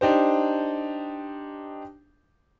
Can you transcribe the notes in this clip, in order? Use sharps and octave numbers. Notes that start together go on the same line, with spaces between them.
D4 D#4 G4 C5